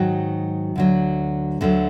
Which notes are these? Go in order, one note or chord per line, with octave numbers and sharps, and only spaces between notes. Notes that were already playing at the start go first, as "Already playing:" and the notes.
Already playing: G#2 D#3 F#3 F#4
D2 D3 F#3
D2 D3 F#3